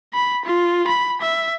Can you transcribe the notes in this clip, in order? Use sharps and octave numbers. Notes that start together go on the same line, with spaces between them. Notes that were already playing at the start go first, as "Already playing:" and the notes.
B5
F4
B5
E5